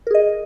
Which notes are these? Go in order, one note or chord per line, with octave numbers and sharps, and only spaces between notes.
G#4 A#4 D#5